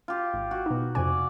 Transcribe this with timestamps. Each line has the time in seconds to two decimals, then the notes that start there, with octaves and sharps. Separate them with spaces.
0.08 F4 G4
0.33 G#1
0.51 F#4
0.66 B2 D#4
0.95 F2 C3 D5 G#5